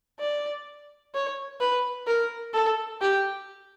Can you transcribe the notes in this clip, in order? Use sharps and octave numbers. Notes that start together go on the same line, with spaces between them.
D5
C#5
B4
A#4
A4
G4